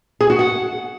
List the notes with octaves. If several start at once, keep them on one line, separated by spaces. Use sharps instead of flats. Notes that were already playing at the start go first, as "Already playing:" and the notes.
G#4
F#4
F#5